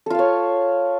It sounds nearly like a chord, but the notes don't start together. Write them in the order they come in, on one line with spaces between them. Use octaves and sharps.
A4 F4 F5 C#5